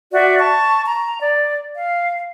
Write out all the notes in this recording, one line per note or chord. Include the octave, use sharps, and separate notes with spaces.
F#4 D5 E5
A5 C#6
A#5
D5
F5